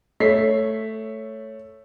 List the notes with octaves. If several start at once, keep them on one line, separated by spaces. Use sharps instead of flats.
A3 C#5 B6 C7